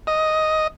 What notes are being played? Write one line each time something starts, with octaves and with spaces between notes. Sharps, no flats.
D#5